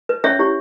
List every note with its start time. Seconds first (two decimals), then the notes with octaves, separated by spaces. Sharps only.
0.09 B4
0.24 C#4 C#5 E5
0.39 E4 G4 C#5